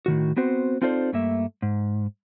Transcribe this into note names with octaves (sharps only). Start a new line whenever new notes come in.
A2 D#3 F#4
B3 C4 F#4 C5
C4 D#4 F4 A4 C5 D5
G2 A3 A#3 E5
G#2